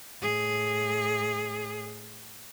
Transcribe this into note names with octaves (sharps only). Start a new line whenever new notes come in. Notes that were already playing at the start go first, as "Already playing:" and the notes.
A2 G#4